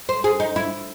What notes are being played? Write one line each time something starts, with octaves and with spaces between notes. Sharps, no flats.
C5
G#4
D#4
E4